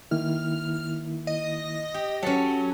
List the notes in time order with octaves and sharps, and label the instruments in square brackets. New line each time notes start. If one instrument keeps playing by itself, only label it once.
[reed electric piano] D#3 A#3 E4 [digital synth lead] F6
[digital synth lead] D#5
[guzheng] G4
[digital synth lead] F#3 [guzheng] C#4 A4